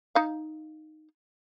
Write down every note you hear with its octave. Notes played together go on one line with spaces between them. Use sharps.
D#4 F5